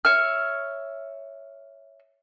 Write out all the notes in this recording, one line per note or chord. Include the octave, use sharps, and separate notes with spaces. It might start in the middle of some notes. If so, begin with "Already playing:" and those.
C#5 E5 F6